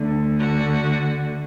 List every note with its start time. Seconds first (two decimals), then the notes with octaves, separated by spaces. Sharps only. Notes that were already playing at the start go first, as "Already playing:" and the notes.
Already playing: D2 D3
0.39 F#4